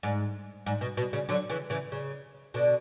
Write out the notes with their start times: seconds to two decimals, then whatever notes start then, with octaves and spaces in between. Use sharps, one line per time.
0.03 G#2
0.66 G#2
0.81 B2
0.97 B2
1.13 C#3
1.29 D3 F#3
1.49 C#3 E3
1.70 C#3 E3
1.92 C#3
2.54 B2 D3